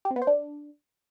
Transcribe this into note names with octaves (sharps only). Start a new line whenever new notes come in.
G4
C4
B3
C5
D4